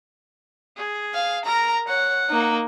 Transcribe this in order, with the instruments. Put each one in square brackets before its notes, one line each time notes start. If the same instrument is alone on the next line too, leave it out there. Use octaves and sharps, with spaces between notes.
[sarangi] G#4
[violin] F5
[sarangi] A#4 [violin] A#5
[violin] C#5 [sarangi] F#5
[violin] A#3 D#4